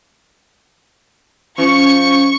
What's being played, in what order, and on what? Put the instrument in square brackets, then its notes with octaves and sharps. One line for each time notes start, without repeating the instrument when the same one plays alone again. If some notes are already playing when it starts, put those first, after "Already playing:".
[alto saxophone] F3 [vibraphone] C#4 [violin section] C#6